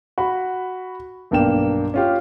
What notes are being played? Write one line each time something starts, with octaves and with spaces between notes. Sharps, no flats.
F#4 B5
B1 G2 A#3 G5 E7
C#4 F4 G4